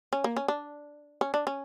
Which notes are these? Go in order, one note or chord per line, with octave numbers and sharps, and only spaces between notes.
C#4
A#3
C#4
D4
C#4
D4
C#4